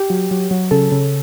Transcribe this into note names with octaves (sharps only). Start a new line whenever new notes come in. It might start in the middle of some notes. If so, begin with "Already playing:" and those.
Already playing: G4
F#3
F#3
F#3
C#3 A4
C#3